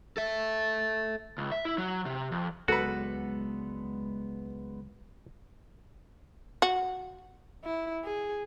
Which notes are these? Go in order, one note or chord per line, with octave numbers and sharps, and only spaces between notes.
A4 E5
C#2
E5
E4
F#3
C3
F2
C#2 F#3 G#3 B3 F#4 A4 B4 D5
F#4
E4
G#4